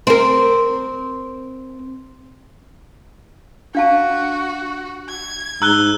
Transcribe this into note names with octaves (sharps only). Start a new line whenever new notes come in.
C4 A#4
D4 F#4 F5 A5
G#6
G#2 A#5 E6 F#6 G7